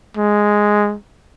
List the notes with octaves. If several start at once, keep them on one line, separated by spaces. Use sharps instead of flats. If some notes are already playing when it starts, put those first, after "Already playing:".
G#3